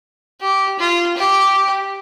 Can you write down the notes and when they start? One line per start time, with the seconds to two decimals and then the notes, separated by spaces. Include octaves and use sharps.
0.41 G4
0.79 F4
1.17 G4